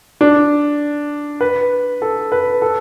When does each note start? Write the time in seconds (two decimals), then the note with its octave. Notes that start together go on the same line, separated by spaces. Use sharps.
0.21 D4
1.41 B4
2.02 A4
2.32 B4
2.62 A4